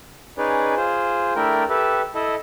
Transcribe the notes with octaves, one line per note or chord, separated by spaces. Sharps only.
C#4 D#4 G#4 B4 D5
F4 G#4 C5
A3 D4 E4 A#4 G5
G4 A4 B4 E5
E4 A4 D#5